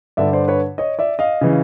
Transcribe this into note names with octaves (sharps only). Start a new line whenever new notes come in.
G2 D3 D5 E5
C5 D5
B4 C#5
C#5 D#5
D5 E5
D#5 F5
C#3 E3